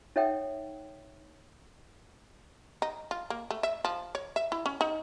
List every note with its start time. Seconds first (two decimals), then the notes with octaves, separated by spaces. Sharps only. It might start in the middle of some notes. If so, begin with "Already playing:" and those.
0.16 D#4 A4 C#5 E5 F#5 G5
2.82 D#4
3.11 F4
3.30 A#3
3.51 A3
3.63 E5
3.85 F3
4.15 C#5
4.36 E5
4.52 E4
4.66 C#4
4.81 D#4